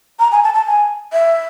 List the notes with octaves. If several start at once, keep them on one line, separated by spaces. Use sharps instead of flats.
A#5
G#5
A5
A5
G#5
E5